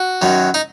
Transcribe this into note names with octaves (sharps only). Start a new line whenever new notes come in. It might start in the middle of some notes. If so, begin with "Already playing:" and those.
Already playing: F#4
F#2 D#3 F#3
D#4